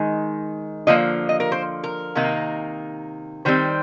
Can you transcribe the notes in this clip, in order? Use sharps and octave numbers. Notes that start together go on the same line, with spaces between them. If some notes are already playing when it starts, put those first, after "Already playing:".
Already playing: D#3 G#3 D#4
D3 F3 A#3 D#5
D#5
A#4
C5
A#4
C3 D#3 A#3 D#4
D#3 G3 C4 C5